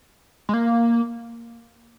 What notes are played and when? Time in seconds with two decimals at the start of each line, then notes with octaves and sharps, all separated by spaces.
0.49 G#3
0.54 A#3